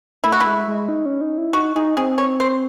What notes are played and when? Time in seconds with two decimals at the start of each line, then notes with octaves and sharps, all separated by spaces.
0.24 A3 E4
0.32 F#4
0.40 E4
0.46 G#3
0.68 G#3
0.88 D#4
1.06 C#4
1.21 D#4
1.38 E4
1.53 D#4 F#4
1.75 D#4 G#4
1.97 C4 G#4
2.18 C#5
2.40 C5